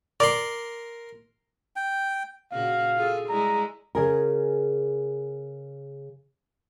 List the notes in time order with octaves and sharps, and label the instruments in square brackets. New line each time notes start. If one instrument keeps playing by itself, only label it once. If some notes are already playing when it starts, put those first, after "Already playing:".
[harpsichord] A#4 C6 [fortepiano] D5
[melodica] G5
[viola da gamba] A#2 C#3 F#4 [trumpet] F5
[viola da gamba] F4 G#4 A4
[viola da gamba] G3 G#3 E4 [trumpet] A#5
[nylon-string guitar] C#3 G#4 A#4